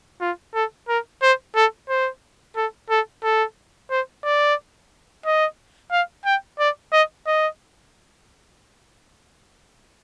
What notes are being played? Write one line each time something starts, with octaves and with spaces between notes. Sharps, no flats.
F4
A4
A#4
C5
A4
C5
A4
A4
A4
C5
D5
D#5
F5
G5
D5
D#5
D#5